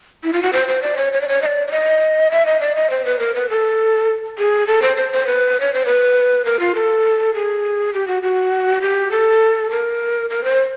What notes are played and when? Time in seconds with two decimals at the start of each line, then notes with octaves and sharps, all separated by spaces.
0.24 E4
0.33 F4
0.43 F#4
0.53 C5
0.68 C5
0.82 D5
0.97 C#5
1.13 C#5
1.21 D5
1.28 C#5
1.42 D#5
1.46 D5
1.68 D5
1.71 D#5
2.31 E5
2.46 D#5
2.61 D5
2.76 D#5
2.90 C5
3.05 B4
3.19 A#4
3.35 B4
3.50 A4
4.39 G#4
4.67 A4
4.82 C5
4.97 C5
5.12 C5
5.27 B4
5.60 C#5
5.74 C5
5.86 B4
6.45 A#4
6.60 F4
6.75 A4
7.34 G#4
7.94 G4
8.07 F#4
8.23 F#4
8.82 G4
9.11 A4
9.71 A#4
10.30 A#4
10.44 C5